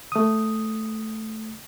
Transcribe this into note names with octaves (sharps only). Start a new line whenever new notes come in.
A3 D#6